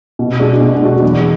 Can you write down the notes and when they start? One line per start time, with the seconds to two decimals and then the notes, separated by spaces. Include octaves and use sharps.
0.19 B2
0.39 G#3 D4 F#4
0.61 B2
0.82 G#3 D4 F#4
1.02 E2